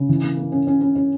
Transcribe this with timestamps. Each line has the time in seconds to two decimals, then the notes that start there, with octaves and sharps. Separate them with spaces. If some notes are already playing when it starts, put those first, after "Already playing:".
Already playing: C#3
0.09 E3
0.23 A#3
0.37 A#3
0.52 C#4
0.67 C#4
0.81 C#4
0.95 C#4